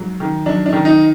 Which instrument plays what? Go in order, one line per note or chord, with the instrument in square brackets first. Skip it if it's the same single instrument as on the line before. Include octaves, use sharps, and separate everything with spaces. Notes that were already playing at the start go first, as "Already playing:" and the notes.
Already playing: [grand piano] G#2 F#3
D#3
F#3 D4
D4
D#3
D#4